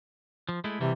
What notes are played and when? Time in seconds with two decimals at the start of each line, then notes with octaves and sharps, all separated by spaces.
0.49 F3
0.64 G#3 A3 E4
0.81 C3 E3 G3